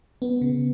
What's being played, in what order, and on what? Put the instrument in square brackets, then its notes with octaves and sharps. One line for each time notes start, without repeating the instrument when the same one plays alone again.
[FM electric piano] B3
C#3